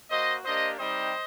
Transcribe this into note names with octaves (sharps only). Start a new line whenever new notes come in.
A#3 F#4 C5 D#5
A#3 D4 G4 C5 D#5
G3 C4 D#4 G4 C5 D#5